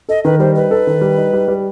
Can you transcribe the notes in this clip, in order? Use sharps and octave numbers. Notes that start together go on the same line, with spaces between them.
A4 D#5
D#3 B4
G3 C5
D#4 B4
A4
D#3
G3
D#4
G3
G3